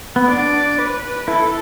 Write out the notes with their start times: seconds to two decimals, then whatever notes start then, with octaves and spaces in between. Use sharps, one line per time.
0.16 B3
0.28 D4 D5
0.78 B4
1.28 E4 A4